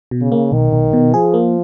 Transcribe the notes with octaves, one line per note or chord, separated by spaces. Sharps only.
B2
C#3
A#3
B1 D#3
B1
B2
F3 G#4
A#3